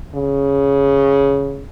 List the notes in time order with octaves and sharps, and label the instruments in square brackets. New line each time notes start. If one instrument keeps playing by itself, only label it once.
[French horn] C#3